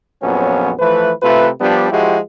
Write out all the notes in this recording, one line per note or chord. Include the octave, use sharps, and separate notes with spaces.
A#1 F2 F#3 B3 C#4
E3 F3 A3 B4
C3 A3 F4 B4
F3 G3 B3 D4
F3 G#3 E4 F#4 G4